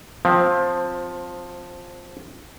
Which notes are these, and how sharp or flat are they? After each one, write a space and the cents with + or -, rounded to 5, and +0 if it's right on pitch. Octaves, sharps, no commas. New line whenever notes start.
F3 +15 C4 +0